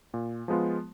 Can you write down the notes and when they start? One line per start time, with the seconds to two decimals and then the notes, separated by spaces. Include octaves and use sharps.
0.14 A#2
0.48 F3 G#3 B3 F4